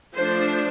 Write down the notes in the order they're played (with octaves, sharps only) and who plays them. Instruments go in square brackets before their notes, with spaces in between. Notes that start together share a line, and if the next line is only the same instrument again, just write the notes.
[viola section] F3 A3 D4 C5